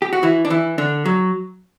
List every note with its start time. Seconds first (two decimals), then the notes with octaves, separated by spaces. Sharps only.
0.02 G4
0.13 F#4
0.23 E3 E4
0.45 D4
0.50 E3 E4
0.78 D3 D4
1.06 F#3